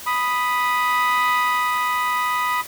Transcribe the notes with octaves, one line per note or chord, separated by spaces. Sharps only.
B5 D#6